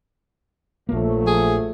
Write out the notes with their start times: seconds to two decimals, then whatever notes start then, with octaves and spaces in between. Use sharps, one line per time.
0.89 A#1 F3 F#3 A3 A#3
1.27 G#4